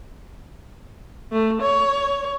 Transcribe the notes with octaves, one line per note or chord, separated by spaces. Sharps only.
A3
C#5